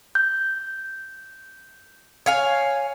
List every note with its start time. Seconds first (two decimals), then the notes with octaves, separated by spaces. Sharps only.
0.15 G6
2.26 C#5 F5 G#5